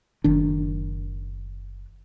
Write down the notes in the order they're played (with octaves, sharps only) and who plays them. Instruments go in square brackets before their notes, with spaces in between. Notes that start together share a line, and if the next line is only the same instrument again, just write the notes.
[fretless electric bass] F#1 D#3 D4